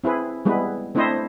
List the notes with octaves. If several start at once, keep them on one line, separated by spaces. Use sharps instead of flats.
C4 E4 G#4 B4
G3 G#3 B3 E4 B4
A3 C4 D4 E4 C5 D#5